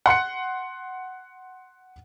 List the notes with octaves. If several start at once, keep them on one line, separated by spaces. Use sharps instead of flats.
F#5 C6 F#6 C#7